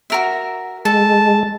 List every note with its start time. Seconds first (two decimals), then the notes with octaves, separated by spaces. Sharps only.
0.10 F#4 A#4 E5
0.85 G#3 A4 A5